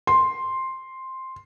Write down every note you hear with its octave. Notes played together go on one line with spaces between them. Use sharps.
C6